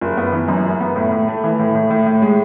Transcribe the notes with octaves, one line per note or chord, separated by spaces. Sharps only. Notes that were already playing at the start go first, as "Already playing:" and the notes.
F#1
B3
E3
F#2
F#1
B3
A2
A2
A3
E3
A2
A2
A2
A2
G#3